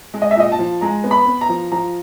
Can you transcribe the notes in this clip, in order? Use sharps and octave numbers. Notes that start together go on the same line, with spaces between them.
G#3
D#5
E5
A#2 D#5
A5
F3
G#3 A#5
B3
B5
B3
A#5
F3
F3 A#5